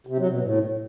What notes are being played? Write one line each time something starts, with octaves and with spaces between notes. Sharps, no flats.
C3
F#3
B2
A2